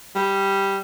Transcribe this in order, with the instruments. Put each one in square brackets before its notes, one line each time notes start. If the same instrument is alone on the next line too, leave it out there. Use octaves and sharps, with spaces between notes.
[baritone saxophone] G3